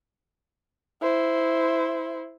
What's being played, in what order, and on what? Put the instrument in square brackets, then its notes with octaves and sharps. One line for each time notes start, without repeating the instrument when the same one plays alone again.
[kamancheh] E4 C5